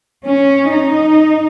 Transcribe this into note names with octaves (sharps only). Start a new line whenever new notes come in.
C#4
D#4